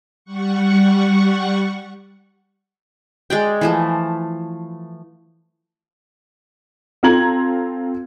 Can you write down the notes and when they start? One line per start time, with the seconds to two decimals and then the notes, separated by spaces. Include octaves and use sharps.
0.25 G3 F#5 C#6
3.30 G#3 D5 G5
3.61 E3 F3 A3
7.03 C4 F4 A4 A#5 G#6 F#7